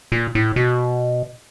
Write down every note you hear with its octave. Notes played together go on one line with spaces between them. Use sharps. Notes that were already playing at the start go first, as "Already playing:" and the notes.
A#2
A2
B2